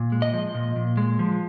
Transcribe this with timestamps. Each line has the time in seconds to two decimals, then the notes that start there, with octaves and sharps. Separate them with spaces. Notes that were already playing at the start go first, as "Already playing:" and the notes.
Already playing: A#2
0.12 G#3
0.22 D#5
0.34 F3
0.55 A#2
0.76 A#2
0.97 G#3
1.19 F3